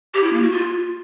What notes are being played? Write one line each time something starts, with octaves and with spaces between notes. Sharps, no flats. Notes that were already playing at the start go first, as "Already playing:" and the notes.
G4
E4
A#3
F#4
F4